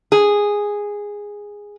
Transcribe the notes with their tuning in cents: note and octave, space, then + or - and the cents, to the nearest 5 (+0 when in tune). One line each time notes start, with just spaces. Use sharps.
G#4 -10